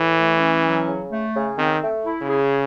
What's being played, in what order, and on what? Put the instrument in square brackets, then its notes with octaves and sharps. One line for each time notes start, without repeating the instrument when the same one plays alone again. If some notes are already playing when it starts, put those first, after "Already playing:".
Already playing: [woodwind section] A2 [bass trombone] E3
[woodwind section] A3
C#4
F#3
C#3
A3
C#3
[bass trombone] D#3 [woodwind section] C4
[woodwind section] A3
E4
[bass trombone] C#3
[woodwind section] G#4